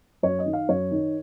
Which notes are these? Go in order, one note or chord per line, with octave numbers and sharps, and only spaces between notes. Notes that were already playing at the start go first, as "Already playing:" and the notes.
F#2 C#5
D#5
D#3
F5
F#2 C#5
D#3